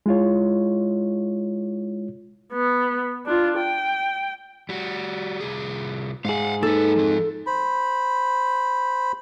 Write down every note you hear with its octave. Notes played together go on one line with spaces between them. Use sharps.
G#3 E4 F4 C#5
B3
D4 F4
G5
G3 F#4
C2 G#4
G#2 G#4 F5 F#5
A#3 D#4 A4 B4
F3 C4
C5 B5